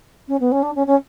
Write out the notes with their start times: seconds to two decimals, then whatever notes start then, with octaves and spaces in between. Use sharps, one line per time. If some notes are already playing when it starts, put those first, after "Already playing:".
0.28 C#4
0.40 B3
0.51 C#4
0.62 D4
0.75 C#4
0.86 C#4